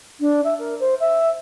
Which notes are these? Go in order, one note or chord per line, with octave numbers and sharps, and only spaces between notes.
D4
E5
A#4
C5
E5